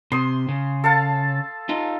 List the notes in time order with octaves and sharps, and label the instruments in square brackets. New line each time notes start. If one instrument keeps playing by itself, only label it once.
[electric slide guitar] C3 [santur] C6 D#6
[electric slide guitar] C#3
[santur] A4 F5 A5
[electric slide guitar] D#4 F4